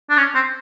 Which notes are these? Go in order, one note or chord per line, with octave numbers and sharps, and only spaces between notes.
D4
C#4
C4